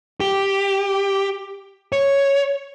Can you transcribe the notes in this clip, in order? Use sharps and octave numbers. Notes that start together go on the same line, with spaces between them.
G4
C#5